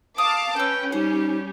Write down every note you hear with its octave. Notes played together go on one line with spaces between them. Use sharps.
F5 A5 D6 D#6
C#4 F4 B4 G5 E6
G3 D#4 G4 C5